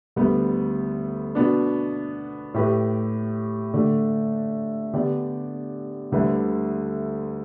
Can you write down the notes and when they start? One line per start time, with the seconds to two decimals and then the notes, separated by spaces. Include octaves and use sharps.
0.16 D2 D3 G3 B3
1.35 B2 B3 D4
2.54 A2 A3 G4 B4
3.74 D3 A3 D4 A4 D5
4.93 D3 B3 D4 G4 D5
6.12 D2 D3 G3 E4 B4